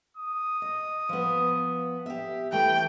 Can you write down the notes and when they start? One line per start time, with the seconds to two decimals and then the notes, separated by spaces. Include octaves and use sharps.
0.17 D#6
0.62 D#5
1.09 F3 B3
2.06 G4 E5
2.52 E3 A3 G5